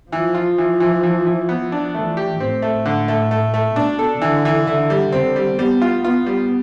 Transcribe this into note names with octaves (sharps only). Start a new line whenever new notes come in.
E3 F3
F4
E3
E3
E3
E3
B3
D4
E3 A3
G4
A2 C4
A3
A2 D3
A3
A2 A3
A3
B2 D4
A4
D3 E3
E3
D3 E4
G3
D3 C4
G3
G3 B3
F4
B3 F4
G3